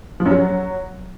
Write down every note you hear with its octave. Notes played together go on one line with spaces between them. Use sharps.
F3
F#2
F#3